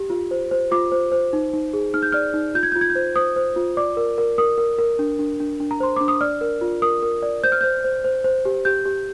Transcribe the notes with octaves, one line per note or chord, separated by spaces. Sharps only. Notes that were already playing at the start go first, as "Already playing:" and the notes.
Already playing: G4
F4
C5
C5
F4 D6
C5
C5
D#4
D#4
G#4
D#4 F6
G6
D5 F6
D#4
F4 G6
G#6
F4 G6
G#6
G6
C5
C5 D#6
C5
F4
D5 D6
A#4
A#4
A#4 D#6
A#4
A#4
D4
D4
D4
D4
A#5
C5 C6
D4 D6
D#6
D5 F6
A#4
F4
A#4 D#6
A#4
D5
C5 G6
F6
C5 G6
C5
C5
C5
G4
G4 G6
G4